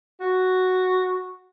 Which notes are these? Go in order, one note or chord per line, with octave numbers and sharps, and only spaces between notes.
F#4